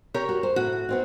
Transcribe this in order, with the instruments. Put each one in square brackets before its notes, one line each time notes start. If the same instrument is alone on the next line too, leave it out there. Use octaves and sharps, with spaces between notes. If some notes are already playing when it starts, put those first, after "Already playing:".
[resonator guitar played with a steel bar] G4 A#4 C#5
[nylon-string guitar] F#4
C5
[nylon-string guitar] A2 [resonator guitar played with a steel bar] F#4
[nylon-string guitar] B3 C4 D#4